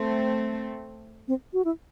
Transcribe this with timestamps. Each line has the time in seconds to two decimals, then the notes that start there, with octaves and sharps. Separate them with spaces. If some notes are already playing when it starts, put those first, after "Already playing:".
Already playing: A3 C4
1.28 C4
1.53 F#4
1.65 E4